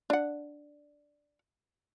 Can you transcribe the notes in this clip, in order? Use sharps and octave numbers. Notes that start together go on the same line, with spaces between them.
D4 F#5